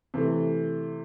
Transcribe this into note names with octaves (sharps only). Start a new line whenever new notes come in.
C3 E3 A3